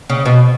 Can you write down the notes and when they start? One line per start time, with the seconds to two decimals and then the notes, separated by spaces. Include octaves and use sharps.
0.10 C#3
0.26 B2